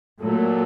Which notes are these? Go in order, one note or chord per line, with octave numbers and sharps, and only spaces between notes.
A#2 F#3 A3